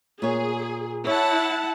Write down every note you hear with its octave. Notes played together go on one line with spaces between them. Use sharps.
A#2 G#4 C#5
E4 C#5 F#5 A5